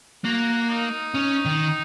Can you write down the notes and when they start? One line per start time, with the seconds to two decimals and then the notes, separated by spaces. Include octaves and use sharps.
0.24 A#3 F#4
0.70 D#4
1.15 C#4
1.45 D#3